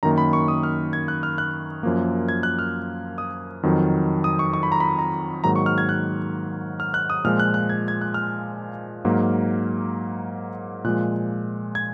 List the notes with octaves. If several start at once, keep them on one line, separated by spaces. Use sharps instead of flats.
F#2 D#3 A#3 A#5
B5
C#6
D#6
F6
G#6
F#6
F6
F#6
F#2 F3 A#3
G#6
F#6
F6
D#6
F2 D#3 F#3
D#6
C#6
C#6
B5
A#5
B5
A#5
G#2 D#3 F#3 A#3 A#5
C#6
F6
G#6
F#6
F6
F#6
D#6
A#2 F3 G#3 F6
F#6
F#6
G#6
G#6
F#6
F6
G#2 F#3 A#3
A#2 F3 G#3 F#6
G#6